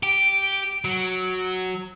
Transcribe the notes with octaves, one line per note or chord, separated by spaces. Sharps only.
G4 D7
F#3